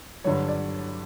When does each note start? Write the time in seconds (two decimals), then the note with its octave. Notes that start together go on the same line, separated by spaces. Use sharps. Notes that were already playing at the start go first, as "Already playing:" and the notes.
0.24 G2 D3 F#3 C#5
0.48 D5